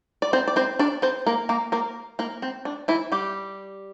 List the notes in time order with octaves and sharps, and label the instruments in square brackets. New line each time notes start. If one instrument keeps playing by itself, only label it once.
[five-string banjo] D5
C4 C5
D5
C4 C5
D4 D5
C4 C5
A#3 A#4
A#3 A#4
A#3 A#4
A#3 A#4
C4
D4
E3 E4
G3 G4